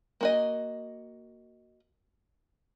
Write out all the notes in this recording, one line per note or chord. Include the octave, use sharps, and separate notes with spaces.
A#3 F#4 D#5